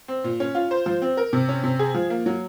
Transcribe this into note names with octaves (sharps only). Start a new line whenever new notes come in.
C4
A#2
C#4
F4
C5
F3
C4
A#4
C3
C#4
C3
G#4
F3
A#3
F#3